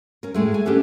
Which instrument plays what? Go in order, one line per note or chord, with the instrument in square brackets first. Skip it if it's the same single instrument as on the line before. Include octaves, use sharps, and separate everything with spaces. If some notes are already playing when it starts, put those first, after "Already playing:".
[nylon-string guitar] C#4 A#4
A2 G#3 A3
G#5
B3 C#4 D4 G4 A4